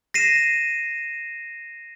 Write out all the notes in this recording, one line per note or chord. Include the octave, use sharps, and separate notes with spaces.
A#6 C7 D#7 E7